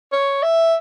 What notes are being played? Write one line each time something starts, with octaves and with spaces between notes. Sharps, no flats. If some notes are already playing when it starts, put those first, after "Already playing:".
C#5
E5